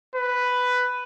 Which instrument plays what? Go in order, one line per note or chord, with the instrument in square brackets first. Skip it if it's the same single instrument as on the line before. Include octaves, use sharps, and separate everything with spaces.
[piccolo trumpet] B4